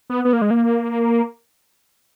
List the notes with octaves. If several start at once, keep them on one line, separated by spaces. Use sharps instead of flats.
B3
B3
A#3
G#3
A#3